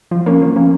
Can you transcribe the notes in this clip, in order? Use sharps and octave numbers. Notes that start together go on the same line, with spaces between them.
F3
A#3 C#4
F3
A#3 C#4